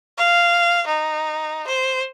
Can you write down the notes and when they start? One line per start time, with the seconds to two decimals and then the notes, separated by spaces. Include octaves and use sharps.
0.18 F5
0.87 D#4
1.67 C5